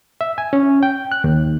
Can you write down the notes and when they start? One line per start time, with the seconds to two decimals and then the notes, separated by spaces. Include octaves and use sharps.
0.21 E5
0.38 G#5
0.53 C#4
0.83 G5
1.12 F#6
1.24 D#2